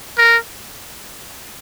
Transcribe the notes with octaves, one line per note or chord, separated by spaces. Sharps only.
A#4